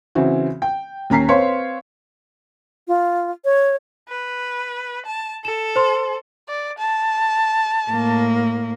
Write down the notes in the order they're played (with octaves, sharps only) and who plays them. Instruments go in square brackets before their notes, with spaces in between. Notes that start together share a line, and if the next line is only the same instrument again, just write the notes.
[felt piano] C#3 E3 C4 F#4
G5
D#2 C#4 A#5 B6 C7
C4 B4 C#5 F5 C6
[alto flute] F4
C#5
[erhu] B4
A5
[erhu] A4 [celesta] E7
[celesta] C5 C6
[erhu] D5
A5
[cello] A2 A#3